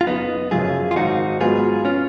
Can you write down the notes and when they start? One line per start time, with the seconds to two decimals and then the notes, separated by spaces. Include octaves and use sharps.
0.01 F4
0.07 F#1 B3 D#4
0.51 F#2 C#3 F3 F4 G#4
0.91 F4
0.96 G#1 D#4 F#4
1.41 G#2 F#3 B3 F4 G#4
1.85 C#4 F4